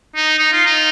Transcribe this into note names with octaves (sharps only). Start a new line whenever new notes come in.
D#4
D#4
F4
D#4